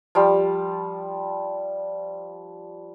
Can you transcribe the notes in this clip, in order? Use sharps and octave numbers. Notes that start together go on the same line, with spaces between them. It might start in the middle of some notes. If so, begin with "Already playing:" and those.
F3 G3